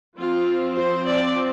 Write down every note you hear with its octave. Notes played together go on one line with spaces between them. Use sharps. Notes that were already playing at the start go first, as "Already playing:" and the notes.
F3 C4 F4
C5
D5